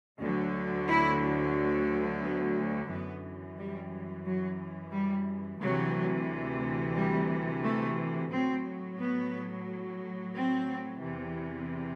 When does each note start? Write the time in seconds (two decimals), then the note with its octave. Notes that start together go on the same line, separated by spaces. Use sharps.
0.20 D2 D3 F#3
0.88 E4
2.22 B3
2.90 F#2 E3 B3
3.58 G3
4.26 F#3
4.93 G3
5.61 D2 C3 E3 F#3
6.96 G3
7.64 A3
8.31 A2 F#3 C4
8.99 B3
10.35 C4
11.02 E2 C3 E3